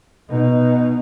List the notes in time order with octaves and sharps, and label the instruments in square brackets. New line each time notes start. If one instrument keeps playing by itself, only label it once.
[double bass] B2 D#4